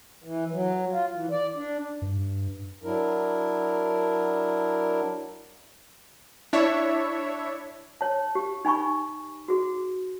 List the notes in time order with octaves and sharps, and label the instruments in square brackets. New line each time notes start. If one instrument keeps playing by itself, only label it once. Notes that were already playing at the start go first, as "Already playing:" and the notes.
[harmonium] E3
F#3
F4
E3
D5
D4
[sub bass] G2
[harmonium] F#3 D4 E4 A#4
[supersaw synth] D4 E4 C#5 E5
[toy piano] C#5 A5
G4
D#4 G#5 B5 C#6
F#4 G#4